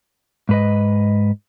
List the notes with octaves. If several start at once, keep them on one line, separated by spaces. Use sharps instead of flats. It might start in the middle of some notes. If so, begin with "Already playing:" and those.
G#2 B4 D#5